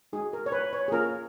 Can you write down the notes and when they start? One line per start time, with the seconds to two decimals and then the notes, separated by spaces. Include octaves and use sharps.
0.13 G#3 D#4 F#4 G#4
0.33 A#4
0.46 C#5
0.52 B4
0.73 C#5
0.88 G#4
0.92 A#3 C#4 F4 A#4